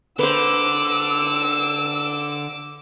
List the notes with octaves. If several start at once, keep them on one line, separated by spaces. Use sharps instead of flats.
D3 B4 C5 D6 E6